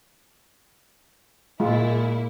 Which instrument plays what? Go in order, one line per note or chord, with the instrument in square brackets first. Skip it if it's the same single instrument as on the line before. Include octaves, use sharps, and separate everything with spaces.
[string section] A#2 E4 [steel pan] G#3 F4